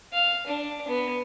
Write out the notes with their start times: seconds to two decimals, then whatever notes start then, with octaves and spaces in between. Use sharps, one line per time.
0.13 F5
0.47 D4
0.88 B3